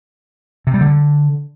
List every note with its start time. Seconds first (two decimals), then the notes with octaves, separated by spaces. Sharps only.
0.67 C3
0.74 G3
0.81 D3